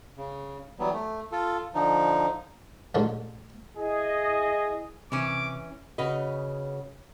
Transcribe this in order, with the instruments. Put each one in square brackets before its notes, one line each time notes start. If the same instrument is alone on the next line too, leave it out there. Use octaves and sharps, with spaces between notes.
[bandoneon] C#3
E3 F#3 G3 B3
A3
F4 A4
D3 F3 D#4
[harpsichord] A1 G2 A#2 D3 G#3 C#4
[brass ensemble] E4 G#4 D#5
[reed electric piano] C3 [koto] E3 C#4 [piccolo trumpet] D6
[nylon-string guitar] C#3 F#4 B4 D#5